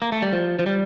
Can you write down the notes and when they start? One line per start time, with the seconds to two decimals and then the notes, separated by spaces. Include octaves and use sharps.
0.02 A#3
0.12 A3
0.22 G3
0.33 F3
0.59 F3
0.66 G3